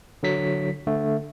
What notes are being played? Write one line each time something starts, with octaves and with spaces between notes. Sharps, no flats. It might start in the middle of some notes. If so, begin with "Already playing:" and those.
D3 F#3 B6
D3 A3